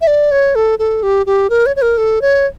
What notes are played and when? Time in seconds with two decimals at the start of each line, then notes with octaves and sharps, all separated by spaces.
0.01 E5
0.07 D5
0.31 C#5
0.55 A4
0.79 A4
1.03 G4
1.26 G4
1.50 A#4
1.66 C#5
1.76 C#5
1.82 A#4
1.98 A4
2.22 C#5